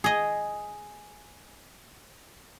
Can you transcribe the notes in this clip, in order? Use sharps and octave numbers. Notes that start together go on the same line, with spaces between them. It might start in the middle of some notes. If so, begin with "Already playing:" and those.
G#4 D#5